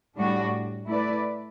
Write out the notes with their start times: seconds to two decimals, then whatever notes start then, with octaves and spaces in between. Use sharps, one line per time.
0.16 A2 G3 D4 F#4
0.87 A3 E4 B4 D5